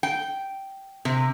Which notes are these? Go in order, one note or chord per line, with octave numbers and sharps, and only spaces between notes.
G5
C3